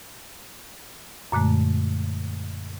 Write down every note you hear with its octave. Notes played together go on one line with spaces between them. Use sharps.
F#2 A#2 D3 G#3 A3